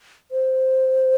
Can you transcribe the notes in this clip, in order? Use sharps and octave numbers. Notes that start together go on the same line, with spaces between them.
C5